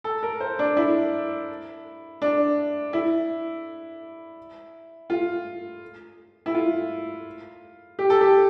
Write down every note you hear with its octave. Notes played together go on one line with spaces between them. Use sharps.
A4
A#4
C5
D4
E4
D4
E4
F4
E4
F4
G4
A4
G4